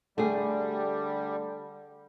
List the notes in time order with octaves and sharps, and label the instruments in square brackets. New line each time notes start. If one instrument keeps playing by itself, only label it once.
[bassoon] D3 [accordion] G3 [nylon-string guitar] A3 G#4